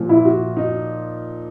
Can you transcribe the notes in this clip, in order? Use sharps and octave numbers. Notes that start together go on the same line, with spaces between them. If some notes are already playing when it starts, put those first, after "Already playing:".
Already playing: A#2 F3
E4
F#4
D#4